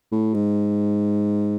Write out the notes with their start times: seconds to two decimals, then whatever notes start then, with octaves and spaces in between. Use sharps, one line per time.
0.12 A2
0.34 G#2